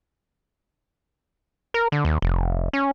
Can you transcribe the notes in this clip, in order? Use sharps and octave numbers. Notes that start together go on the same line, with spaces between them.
A#4
D3
D#2
F1
C#4